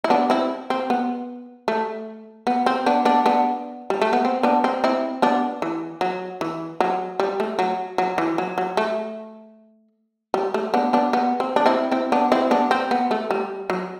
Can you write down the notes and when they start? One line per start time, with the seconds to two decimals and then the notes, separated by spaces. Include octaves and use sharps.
0.04 E4
0.10 B3 D4
0.30 C4 E4
0.70 C4
0.90 B3
1.68 A3
2.47 B3
2.66 C4
2.86 B3 D4
3.05 B3 D4
3.26 B3 D4
3.90 G3
4.02 A3
4.13 B3
4.25 C4
4.43 B3 D4
4.64 C4
4.84 C4 E4
5.22 B3 D4
5.62 E3
6.01 F#3
6.41 E3
6.80 F#3
7.20 G3
7.40 A3
7.59 F#3
7.98 F#3
8.18 E3
8.38 F#3
8.58 F#3
8.77 A3
10.34 G3
10.54 A3
10.74 B3 D4
10.93 B3 D4
11.13 B3
11.40 C4
11.56 D4
11.66 C4 E4
11.92 C4 E4
12.12 B3 D4
12.32 C4 E4
12.51 B3 D4
12.71 C4
12.91 B3
13.11 A3
13.31 G3
13.70 F#3